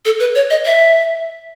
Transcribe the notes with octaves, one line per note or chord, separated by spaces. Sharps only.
A4
B4
C#5
D#5
E5